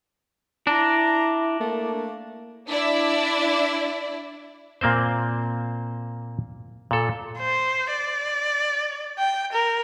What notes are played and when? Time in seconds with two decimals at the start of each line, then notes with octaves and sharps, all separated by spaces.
0.67 D4 E4 A#5
1.60 A3 A#3
2.68 D4 E4 D5
4.81 A#2 A#3 C4 C5
6.91 A#2 A4
7.39 C5
7.92 D5
9.18 G5
9.53 A#4